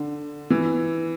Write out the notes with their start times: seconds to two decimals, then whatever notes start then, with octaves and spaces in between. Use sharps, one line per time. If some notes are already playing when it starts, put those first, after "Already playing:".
Already playing: D3
0.50 E3